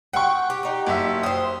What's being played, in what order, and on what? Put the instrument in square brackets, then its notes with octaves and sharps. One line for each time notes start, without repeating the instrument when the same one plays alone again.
[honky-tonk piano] F#5 C#6 [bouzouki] G5
[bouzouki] G4
D#4 G4
[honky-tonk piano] F#1 E5
[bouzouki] C5 G5 [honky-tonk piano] D#6